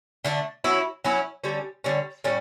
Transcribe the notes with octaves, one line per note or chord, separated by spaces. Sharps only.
D3 A3 D4
F#3 C#4 E4
F#3 C#4 E4
D3 G3 C#4
D3 G3 C#4
A2 G3 C#4